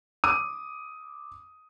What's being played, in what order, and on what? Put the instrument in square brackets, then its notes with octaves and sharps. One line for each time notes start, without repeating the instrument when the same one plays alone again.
[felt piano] D6 D#6 D#7